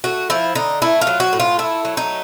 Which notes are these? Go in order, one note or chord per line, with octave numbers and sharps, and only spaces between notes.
A3 F#4
F3 E4
D3 D#4
A3 E4
F4
F#3
F#4
A2
F4
A3 E4
F#3
D#4